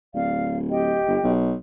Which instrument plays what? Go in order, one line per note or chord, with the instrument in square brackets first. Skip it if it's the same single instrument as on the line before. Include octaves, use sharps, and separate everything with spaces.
[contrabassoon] D1 [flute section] D5 F5
[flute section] G4 D#5 G5
[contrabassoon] G1
B1